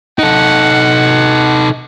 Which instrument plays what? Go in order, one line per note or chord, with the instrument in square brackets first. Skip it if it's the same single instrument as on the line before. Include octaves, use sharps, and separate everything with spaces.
[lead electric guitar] D#4 A4 [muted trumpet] F#5